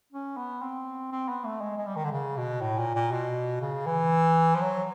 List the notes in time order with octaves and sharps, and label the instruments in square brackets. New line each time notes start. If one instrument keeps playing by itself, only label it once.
[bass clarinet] C#4
B3
C4
C4
B3
A3
G#3
G#3
G3
D#3
D3
C#3
B2
A2
A#2
A#2
B2
C#3
E3
F3
F#3